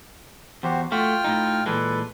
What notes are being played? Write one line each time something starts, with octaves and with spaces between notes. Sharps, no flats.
E2 F#4 G4 C5
A3 F4 F#4 G5 F6
A2 D#4
A#2 E3 G#3 A4 B4